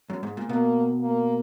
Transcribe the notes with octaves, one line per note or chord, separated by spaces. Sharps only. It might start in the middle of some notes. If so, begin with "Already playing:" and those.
F#2
G#2
A#2
B2 A#3
A#3